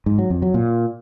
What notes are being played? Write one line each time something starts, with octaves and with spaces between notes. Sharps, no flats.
G#2
F#3
F2
F#3
A#2